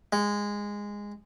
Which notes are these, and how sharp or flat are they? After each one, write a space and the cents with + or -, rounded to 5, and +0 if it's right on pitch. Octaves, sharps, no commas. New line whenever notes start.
G#3 -15